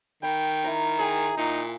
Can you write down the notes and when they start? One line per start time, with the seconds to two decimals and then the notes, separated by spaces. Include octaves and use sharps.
0.23 D#3 G5 B5
0.64 E4 F5 A#5
0.99 G#4 G5 G#5 A#5
1.37 A#2 D#4